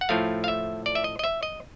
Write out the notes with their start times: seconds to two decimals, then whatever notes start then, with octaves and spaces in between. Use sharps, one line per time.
0.01 F#5
0.09 A2 F3 A3 F5
0.44 F5
0.48 E5
0.86 D5
0.95 E5
1.04 D#5
1.19 D#5
1.24 E5
1.43 D#5